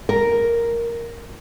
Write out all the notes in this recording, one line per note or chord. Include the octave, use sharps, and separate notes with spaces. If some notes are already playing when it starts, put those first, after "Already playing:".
A#4